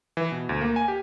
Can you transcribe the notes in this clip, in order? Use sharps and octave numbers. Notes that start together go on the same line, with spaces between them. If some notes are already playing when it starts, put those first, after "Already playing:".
E3
B2
D2
A#3
G#5
G4